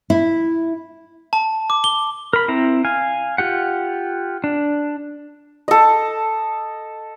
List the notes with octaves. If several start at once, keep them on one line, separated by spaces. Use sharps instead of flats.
E4
A5
D6
G7
A#4 B5
C4 E4 A#5
F5 G#5
F4 G4 F#5
D4
A4 D#5